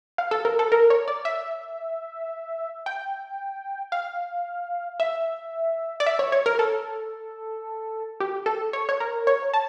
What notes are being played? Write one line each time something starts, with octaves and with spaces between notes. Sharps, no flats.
F5
A4
A#4
A4
A#4
C#5
D5
E5
G5
F5
E5
D5
E5
C#5
C#5
A#4
A4
G4
A4
C#5
C#5
A#4
C#5
A5